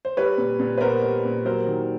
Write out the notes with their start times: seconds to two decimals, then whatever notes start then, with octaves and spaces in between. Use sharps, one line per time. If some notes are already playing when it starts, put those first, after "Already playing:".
0.05 C5
0.17 G3 B4 C#5
0.38 A#2
0.59 A#2
0.78 B4
0.81 B3 A#4 C5
1.02 G3
1.25 A#2
1.45 F#3 A#4 C5
1.66 D#3